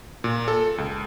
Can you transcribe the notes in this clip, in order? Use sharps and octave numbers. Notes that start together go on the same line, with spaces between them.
A#2
A4
C#2